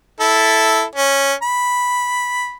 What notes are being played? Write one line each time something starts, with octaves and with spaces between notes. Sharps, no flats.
E4 A4
C#4
B5